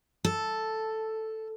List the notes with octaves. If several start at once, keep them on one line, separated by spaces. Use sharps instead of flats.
A4